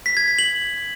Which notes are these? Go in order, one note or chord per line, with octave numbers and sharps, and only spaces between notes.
B6
G#6
B6
F#7